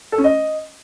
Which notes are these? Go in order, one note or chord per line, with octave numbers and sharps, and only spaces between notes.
A4
C#4
D#5